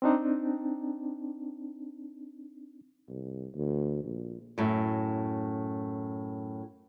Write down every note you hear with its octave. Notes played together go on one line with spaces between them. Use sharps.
C4 D4 D#4
C2
D2
A#1
F#2 A2